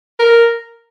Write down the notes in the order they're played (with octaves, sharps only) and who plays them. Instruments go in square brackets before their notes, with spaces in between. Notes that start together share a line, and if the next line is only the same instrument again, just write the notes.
[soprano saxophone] A#4